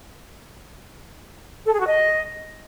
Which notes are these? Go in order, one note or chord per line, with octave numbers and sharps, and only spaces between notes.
A4
G#4
F#4
D#5